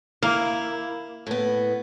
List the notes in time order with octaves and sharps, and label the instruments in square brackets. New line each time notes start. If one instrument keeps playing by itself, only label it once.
[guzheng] A#3 [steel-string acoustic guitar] E4
[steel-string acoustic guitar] A2 B3